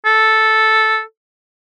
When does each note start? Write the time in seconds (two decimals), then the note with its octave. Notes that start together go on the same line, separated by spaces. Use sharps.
0.05 A4